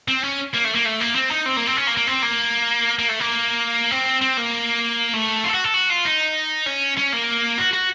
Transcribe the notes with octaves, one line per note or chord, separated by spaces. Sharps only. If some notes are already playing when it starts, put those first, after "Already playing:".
C4
C#4
A#3
A3
A#3
A3
A#3
C4
D#4
C4
A#3
C4
C#4
A#3
A#3
C4
A#3
A#3
A3
A#3
C4
C4
A#3
A3
F4
A4
F#4
A4
F#4
F4
D#4
C#4
C#4
A#3
F#4
F#4